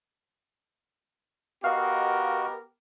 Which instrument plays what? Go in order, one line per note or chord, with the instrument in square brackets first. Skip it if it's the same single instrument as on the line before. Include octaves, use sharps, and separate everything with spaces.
[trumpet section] B3 G4 A#4 [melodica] F#4 [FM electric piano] D#5 F5